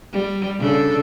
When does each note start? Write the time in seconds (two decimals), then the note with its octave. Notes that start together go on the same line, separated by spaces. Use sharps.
0.12 G3
0.58 C#3 D4 A4